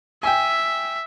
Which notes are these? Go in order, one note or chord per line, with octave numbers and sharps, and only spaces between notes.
E5 G5 G#5